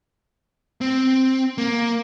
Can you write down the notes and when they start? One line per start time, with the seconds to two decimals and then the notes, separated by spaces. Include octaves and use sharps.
0.81 C4
1.58 A#3